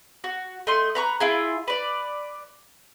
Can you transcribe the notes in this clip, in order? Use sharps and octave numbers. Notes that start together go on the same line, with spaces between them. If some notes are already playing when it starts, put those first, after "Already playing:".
F#4
A3 D#5 C6
B4 A#5 C#6
E4 F4 G#4
B4 D5